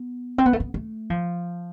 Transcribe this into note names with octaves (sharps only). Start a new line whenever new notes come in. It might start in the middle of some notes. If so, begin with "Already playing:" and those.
Already playing: B3
C4
B3
A3
B3
A3
F3